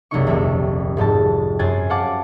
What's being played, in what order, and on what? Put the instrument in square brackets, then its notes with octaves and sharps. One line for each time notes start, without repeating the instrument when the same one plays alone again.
[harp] F#1 C2 F#3 A#3 D#4 C#6
D#1 F2 C4 E5 G5
F1 G#2 C4 A5
F#2 C5 G5 G#5 F#6 A6
C5 C#5 F5 F#5 A5 D6